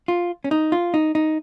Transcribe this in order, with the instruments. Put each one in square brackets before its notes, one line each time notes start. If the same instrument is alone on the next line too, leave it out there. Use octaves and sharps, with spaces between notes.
[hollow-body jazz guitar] F4
C#4
D#4
F4
D#4
D#4